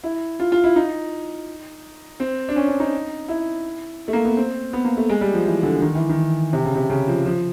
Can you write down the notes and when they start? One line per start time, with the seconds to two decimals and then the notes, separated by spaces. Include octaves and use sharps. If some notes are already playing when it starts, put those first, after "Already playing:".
0.04 E4
0.40 F4
0.52 F4
0.64 E4
0.76 D#4
2.20 C4
2.49 D4
2.56 C#4
2.68 D4
2.80 D#4
3.29 E4
4.08 A3
4.13 A#3
4.25 B3
4.37 C4
4.73 B3
4.85 A#3
4.97 A3
5.09 G#3
5.21 G3
5.34 F3
5.45 E3
5.63 D3
5.82 D#3
5.95 E3
6.09 D#3
6.53 C3
6.65 C#3
6.75 C3
6.90 C#3
7.08 F3
7.26 F3